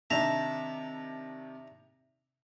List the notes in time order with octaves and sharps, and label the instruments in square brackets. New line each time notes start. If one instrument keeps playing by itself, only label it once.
[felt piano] C3 D#3 D4 [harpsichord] E5 A5 A#5